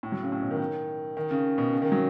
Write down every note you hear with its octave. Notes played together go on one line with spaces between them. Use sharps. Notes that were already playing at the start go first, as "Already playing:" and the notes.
A2
F#3
C#3
A2
B2
D#3
D#3
C#3
B2
C#3
D#3
F#3